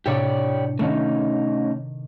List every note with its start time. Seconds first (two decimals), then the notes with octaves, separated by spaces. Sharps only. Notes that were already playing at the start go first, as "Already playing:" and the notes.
0.06 A2 C3 D4 G4 C#5 D5
0.79 D#3 A3 C#4 D#4